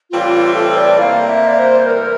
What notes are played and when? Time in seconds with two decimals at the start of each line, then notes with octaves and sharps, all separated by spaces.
0.11 A2 E3 G3 C4 F4
0.32 F4
0.54 A4
0.77 D5
0.99 C3 G3 A#3 F5
1.28 E5
1.47 D5
1.57 C5
1.80 C5
1.86 E3 A3 A#4